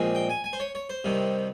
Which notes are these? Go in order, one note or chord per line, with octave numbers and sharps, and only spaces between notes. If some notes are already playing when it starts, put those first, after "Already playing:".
Already playing: A#1 A#2 G#3 C4
G5
G#5
G#5
C5
C#5
C#5
C5
C2 C3 D#3